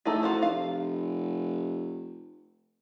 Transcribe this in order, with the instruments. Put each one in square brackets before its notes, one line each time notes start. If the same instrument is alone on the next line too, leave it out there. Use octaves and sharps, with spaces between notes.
[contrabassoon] A2 [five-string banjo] A3 D#4 G#4
[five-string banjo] F4 F#4 C5
[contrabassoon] F1 [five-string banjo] F5